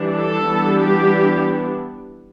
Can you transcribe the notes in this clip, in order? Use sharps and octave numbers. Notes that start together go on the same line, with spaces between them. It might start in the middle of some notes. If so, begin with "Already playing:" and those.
Already playing: E3 G3 D4
A4
E3 G3 B3 D4
G4